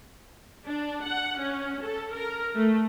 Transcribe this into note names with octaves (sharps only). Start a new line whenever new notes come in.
D4
F#5
C#4
A4
A#4
A3